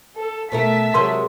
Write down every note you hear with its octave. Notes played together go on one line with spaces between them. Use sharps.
A4
B2 A3 A#4 E5 A5 B6
C3 F#3 G#3 A#4 C6